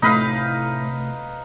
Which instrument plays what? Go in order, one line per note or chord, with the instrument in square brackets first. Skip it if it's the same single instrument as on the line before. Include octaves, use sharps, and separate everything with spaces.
[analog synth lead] A2 [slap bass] C3 A3 [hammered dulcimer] D#4 B4 F5